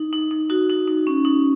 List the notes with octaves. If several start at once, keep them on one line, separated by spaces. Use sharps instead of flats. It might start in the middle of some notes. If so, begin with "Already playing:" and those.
Already playing: D#4
D#4
D#4
D#4 F#4
D#4
D#4
C#4
D#4